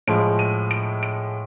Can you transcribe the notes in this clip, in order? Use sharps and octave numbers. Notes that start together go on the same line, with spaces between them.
A2 F3 G#3 D7
D#7
D7
D7